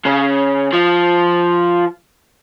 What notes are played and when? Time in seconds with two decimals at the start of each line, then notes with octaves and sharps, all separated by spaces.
0.05 C#3
0.73 F3